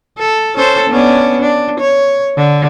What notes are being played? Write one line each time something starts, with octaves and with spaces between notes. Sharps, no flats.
A4
C#4 A4 C5
B3 C#4 D4
D4
C#5
D3